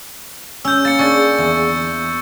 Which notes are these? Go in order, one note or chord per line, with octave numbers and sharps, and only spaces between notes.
C#4 E6 G6
A#3 A6 C#7
D4 G#4 C#6 A6
E2